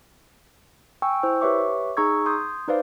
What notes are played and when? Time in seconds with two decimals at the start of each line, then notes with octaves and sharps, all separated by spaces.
1.02 G5 G#5 C#6 E6
1.23 E4 C5 E6
1.41 G4 B4 C#5 E5 C#6 D6
1.97 D#4 G#4 A#5 C#6 E6 G#6
2.26 C6 D#6 G6 G#6
2.68 D#4 B4 C5 D5 F5